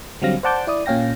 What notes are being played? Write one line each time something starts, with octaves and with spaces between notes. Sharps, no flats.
D3 F#3 G3 C4 F5 A#6
C5 D5 F#5 A5 D6 G6
E4 D5 D#6
A#2 C#4 F5 G5 A#6